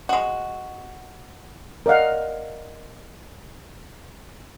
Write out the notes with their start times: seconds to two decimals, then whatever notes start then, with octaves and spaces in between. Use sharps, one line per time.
0.09 G#3 F#4
1.86 A#4 D5 D#5 F5 F#5